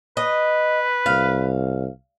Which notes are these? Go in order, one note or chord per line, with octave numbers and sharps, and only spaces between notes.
B4 D#5
C2 F5